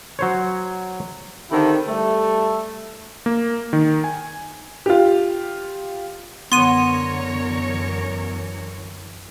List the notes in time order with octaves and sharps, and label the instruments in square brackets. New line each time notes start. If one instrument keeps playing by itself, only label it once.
[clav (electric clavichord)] F#3 C5 C#5
[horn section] D3 D#3 C4 E4 G4 A4
G3 A3 A4
[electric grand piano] A#3
D#3
G#5
[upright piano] F4 G4
[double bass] F#2 E3 [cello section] D3 A#4 C#5 [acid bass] B3 [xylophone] C6 D#7